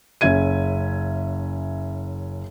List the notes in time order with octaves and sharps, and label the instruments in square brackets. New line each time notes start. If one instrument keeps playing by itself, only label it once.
[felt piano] F#1 C#4 E5 G#6 D#7